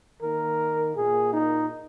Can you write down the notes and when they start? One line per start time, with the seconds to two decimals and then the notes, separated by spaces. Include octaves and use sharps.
0.21 D#3 A#3 A#4
0.96 A#2 A#3 G#4
1.33 D#4